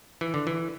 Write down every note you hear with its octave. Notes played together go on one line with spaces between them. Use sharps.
E3
D3
E3